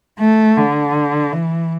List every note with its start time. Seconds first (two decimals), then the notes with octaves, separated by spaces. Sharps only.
0.20 A3
0.57 D3
1.32 E3